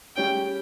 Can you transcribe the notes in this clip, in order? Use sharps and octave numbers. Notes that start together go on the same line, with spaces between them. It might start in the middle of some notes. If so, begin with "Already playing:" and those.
G3 C#4 G#4 G5